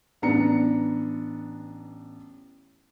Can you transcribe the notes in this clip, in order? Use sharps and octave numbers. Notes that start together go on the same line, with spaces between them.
A1 B3 D4 A#5 C#7